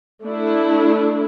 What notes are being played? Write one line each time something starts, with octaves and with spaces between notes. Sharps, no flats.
A3 D4 E4